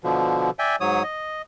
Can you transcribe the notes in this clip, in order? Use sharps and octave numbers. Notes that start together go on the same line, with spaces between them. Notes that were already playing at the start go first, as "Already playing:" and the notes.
B2 D3 F3
D5 E5 G5 G#5
G#2 F#3 C#5 D#6
D#5